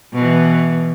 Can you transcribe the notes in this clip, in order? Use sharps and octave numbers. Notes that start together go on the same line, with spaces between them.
B2 E3